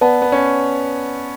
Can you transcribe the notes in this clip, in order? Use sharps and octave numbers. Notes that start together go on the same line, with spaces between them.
B3 B4 D5 F#5 A5
B3
C#4